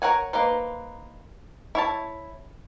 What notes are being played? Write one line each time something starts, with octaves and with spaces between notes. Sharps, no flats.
A#4 C#5 F#5 G#5
A#3 D#4 B4 C5
E4 C#5 A5